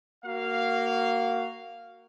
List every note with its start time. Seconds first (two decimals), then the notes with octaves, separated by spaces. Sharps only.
0.24 A#3 F#4 F5